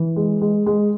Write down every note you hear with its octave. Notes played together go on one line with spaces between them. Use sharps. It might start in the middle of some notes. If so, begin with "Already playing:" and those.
Already playing: E3
G#3
G#3
G#3